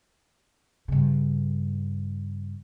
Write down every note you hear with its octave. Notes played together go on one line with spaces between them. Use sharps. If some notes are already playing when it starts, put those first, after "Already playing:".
G2 C#3